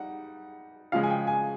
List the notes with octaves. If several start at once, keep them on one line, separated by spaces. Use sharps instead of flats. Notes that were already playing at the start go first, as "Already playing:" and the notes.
Already playing: G3 D#4 F#5
C#3 F3 G#3 F5
G#5
G5
G#5